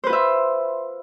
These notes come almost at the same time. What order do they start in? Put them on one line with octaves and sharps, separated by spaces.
C5 B4 F4 E5